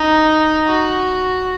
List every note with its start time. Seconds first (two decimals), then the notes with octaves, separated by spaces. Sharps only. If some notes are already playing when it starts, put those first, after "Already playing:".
Already playing: D#4
0.67 F#4